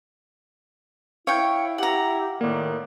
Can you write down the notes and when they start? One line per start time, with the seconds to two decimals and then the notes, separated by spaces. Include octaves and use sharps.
1.27 E4 C#5 F5 G5
1.78 G4 F#5 A#5
2.41 A2 D#3 A#3 D5